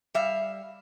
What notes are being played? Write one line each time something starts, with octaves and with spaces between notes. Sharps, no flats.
G3 E5 F5